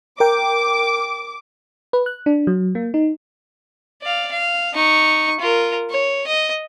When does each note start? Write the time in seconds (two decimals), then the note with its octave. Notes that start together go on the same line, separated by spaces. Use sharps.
0.20 A#4 G5 D6
1.93 B4
2.06 F#6
2.26 D4
2.47 F#3
2.75 A#3
2.94 D#4
4.02 D5 F5
4.32 F5
4.74 D#4 C#6
5.40 F4 A#4
5.90 C#5
6.27 D#5